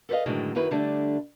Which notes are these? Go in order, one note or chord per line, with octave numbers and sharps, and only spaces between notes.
A4 B4 C5 D#5 F5
F#2 A2 D3 D#3 F#3 G#3
F#2 D#3 F#3 E4 B4
D3 G3 A3 D4